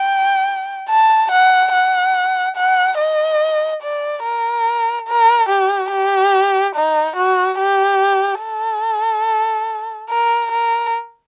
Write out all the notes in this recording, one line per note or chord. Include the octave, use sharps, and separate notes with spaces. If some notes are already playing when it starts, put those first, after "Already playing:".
Already playing: G5
A5
F#5
F#5
F#5
D#5
D5
A#4
A#4
G4
G4
D#4
F#4
G4
A4
A#4
A#4